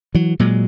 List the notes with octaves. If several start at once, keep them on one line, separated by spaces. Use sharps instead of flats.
E3 F#3
A#2 F#3 G#3